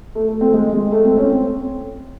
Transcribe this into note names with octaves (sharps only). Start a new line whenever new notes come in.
A3
A3
C4
G#3
G#3
A3
C4
C#4
C4